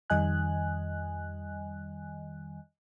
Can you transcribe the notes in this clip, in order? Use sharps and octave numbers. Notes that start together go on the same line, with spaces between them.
F2 D#3 G3 D#5 G#5 F#6